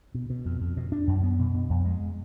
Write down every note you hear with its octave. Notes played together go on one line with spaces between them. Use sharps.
B2
B2
F2
F2
B2
D4
F#2
B3
B2
B2
F2
G#3